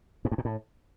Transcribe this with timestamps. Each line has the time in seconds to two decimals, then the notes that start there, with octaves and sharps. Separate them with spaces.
0.25 G#2
0.31 G2
0.38 A#2
0.45 A2